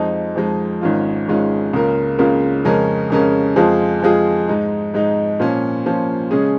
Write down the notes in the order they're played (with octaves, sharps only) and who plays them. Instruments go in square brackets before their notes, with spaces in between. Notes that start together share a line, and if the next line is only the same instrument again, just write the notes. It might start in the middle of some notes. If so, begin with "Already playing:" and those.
Already playing: [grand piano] F2 F3 G#3 D#4
F2 F3 G#3 D#4
G#1 G#2 G#3 C#4 F4
G#1 G#2 G#3 C#4 F4
C#2 C#3 A#3 F4 A#4
C#2 C#3 A#3 F4 A#4
F2 C#3 G#3 C#4 A#4
F2 C#3 G#3 C#4 A#4
F2 F3 G#3 F4 G#4
F2 F3 G#3 F4 G#4
G#2 G#3 D#4
G#2 G#3 D#4
A#2 F3 C#4
A#2 F3 C#4
C#3 G#3 C#4 G#4